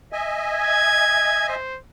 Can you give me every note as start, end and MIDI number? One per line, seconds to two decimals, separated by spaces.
0.12 1.55 75
0.12 1.55 76
0.12 1.55 80
0.54 1.45 92
1.49 1.79 72